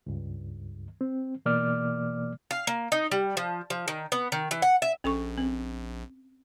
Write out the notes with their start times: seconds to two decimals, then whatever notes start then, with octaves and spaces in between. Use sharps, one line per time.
0.06 C#2 G2
1.01 C4
1.46 B2 E3 A#3 D5 D6 F6
2.51 F5
2.67 A#3
2.92 D#4
3.12 G3
3.37 F3
3.70 F3
3.88 D#3
4.12 B3
4.32 D#3
4.51 E3
4.62 F#5
4.82 E5
5.04 A#1 C#4 A4 C#6
5.38 C4